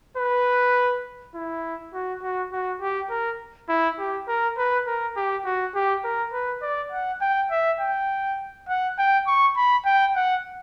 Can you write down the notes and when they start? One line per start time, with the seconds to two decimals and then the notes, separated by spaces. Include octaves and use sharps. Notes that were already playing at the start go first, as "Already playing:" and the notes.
0.17 B4
1.35 E4
1.93 F#4
2.23 F#4
2.52 F#4
2.81 G4
3.10 A#4
3.69 E4
3.99 G4
4.28 A#4
4.58 B4
4.87 A#4
5.17 G4
5.45 F#4
5.75 G4
6.04 A#4
6.33 B4
6.62 D5
6.92 F#5
7.21 G5
7.51 E5
7.80 G5
8.68 F#5
8.98 G5
9.27 C#6
9.57 B5
9.85 G5
10.16 F#5